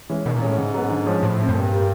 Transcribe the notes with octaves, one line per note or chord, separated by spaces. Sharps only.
E3 G#3 C#4
B2 D#3
A#2
A2 G#3 C#4
G#2 C#3
F#3 B3
D3
F3 G#3 C#4
A2 F3
A3 C4
F#2
G2 A#2
G3 A#3